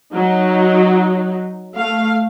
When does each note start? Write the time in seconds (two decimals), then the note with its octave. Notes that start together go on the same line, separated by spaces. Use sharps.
0.14 F#3 D#4
1.76 A3 F5